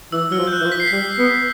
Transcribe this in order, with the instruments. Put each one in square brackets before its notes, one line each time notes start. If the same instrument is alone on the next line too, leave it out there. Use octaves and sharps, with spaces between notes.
[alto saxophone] E3 [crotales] E6
[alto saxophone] F#3 [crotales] F6
[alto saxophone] F3
[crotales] G6
F#6
[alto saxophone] E3
F3
[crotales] B6
C7
[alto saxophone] G3 [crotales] B6
[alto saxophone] B3